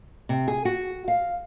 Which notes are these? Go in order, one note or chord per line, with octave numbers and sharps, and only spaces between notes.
C3
G#4
F#4
F5